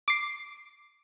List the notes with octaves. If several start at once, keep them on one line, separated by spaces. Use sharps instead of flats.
D6 C7